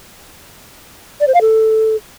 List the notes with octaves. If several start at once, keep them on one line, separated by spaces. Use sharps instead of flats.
D5
C5
F5
A4